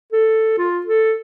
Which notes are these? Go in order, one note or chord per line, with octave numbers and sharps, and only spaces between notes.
A4
F4
A4